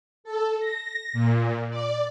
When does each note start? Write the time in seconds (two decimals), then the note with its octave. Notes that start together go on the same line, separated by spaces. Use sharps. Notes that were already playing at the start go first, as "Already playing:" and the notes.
0.24 A4
0.59 A#6
1.13 A#2
1.70 D5